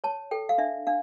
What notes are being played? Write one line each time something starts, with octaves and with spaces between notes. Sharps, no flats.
C#5 A5
A4 G5
F5
D4 E5
D4 F5